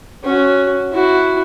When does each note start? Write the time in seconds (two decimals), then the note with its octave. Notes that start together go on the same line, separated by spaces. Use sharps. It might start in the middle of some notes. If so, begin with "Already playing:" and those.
0.23 C#4 F#4
0.91 E4 F#4